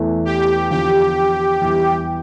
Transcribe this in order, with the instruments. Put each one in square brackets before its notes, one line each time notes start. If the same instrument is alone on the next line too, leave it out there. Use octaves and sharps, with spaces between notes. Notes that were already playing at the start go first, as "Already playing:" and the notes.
Already playing: [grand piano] E2 E3 A3 E4
[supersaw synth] G4
[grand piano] E2 D3 F3 [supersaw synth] G4
[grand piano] E2 E3 G3